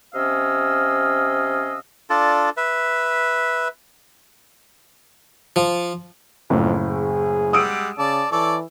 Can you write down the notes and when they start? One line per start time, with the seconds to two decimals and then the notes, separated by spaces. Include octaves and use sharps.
0.15 C3 C#4 D#5 F5 E6
2.10 D4 F4 A4 D5
2.57 B4 E5
5.56 F3
6.50 F#1 F2 A2
6.88 G#4
7.53 G3 G#3 F#5 D#6 E6 D7
7.98 C#3 D5 A5
8.32 E3 A4 C#5 D5